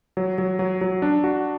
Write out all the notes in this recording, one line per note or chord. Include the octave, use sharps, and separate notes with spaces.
F#3
F#3
F#3
F#3
D4
F#4